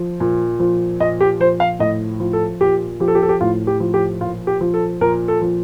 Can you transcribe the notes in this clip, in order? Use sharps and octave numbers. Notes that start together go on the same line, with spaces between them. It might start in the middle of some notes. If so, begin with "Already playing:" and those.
Already playing: F3
A#2
F3
A#2 D#5
G4
F3 C5
F5
A2 D#5
F3
A4
A#2 G4
F3 G4
A4
G4
A4
G4
A2 F4
G4
F3
G4
A#2 F4
G4
F3
A4
A#2 A#4
A4
F3